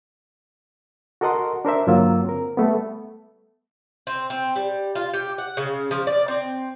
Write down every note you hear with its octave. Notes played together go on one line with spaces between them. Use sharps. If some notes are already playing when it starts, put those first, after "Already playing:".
F#4 A4 A#4 D#5 F#5 C6
D4 A#4 C5 E5
G2 D3 F#3 A#3 F4 E6
C4 A#4
G3 A3 B3
C4
C4
G3
F4
G4
F#5
C#3
F3
D5
C4